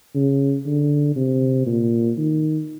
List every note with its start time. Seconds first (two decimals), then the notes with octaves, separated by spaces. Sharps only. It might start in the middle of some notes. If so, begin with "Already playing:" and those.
0.15 C#3
0.66 D3
1.16 C3
1.66 A#2
2.17 D#3